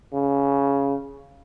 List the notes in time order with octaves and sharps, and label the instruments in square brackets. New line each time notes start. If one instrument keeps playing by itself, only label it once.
[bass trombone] C#3